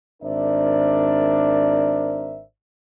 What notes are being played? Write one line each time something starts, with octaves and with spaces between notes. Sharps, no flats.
G#1 D4 A#4 C5 D5 E5